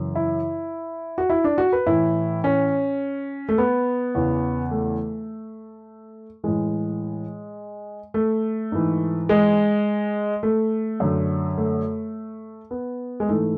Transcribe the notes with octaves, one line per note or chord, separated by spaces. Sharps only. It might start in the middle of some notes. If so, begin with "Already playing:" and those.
Already playing: F#2 C#3 E3
E4
F#4
E4
D4
F#4
B4
A2 E3 E4
C#4
A3
B3
E2 C#3 E3
A3
A2 E3 G#3
A3
G#2 E3
G#3
A3
F#2 D3
A3
B3
G#3
G#2 E3 A3